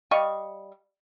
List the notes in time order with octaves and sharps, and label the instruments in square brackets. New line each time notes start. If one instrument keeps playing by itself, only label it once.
[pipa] G3 D#5 F5 C#6